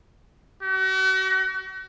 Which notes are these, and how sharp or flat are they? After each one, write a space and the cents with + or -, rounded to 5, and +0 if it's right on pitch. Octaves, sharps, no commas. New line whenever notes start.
F#4 +40